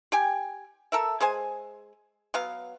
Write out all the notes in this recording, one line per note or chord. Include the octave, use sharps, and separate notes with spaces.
G4 G5 G#5
A4 A#4 E5
G#3 G#4 C5 G#5
F#3 B3 F5